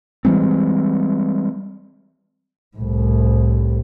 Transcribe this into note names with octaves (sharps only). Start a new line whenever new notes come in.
E3 G3 G#3 C4
C2 A2